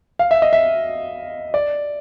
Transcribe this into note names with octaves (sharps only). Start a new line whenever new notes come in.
F5
E5
D#5
E5
D5